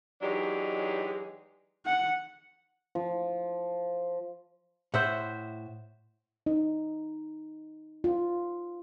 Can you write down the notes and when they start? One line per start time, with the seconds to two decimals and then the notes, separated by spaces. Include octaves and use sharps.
0.22 E3 F#3 G#3 D4 D#4 G4
1.86 F#5
2.95 F3
4.94 A2 C5 E5 F#5
6.46 D#4
8.04 F4